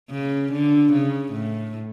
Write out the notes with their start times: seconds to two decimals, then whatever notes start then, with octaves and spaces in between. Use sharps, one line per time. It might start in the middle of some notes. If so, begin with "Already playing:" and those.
0.11 C#3
0.52 D3
0.93 C#3
1.33 A2